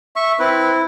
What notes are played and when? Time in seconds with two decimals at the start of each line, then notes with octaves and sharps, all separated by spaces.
0.16 E5 C#6
0.40 C4 E4 B4